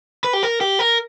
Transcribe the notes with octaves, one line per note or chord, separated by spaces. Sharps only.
B4
G4
A#4
G4
A#4